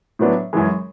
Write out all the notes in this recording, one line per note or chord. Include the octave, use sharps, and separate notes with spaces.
A2 F#3 B3 D4
F#2 E3 G#3